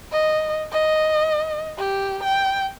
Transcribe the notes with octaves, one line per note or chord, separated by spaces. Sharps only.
D#5
D#5
G4
G5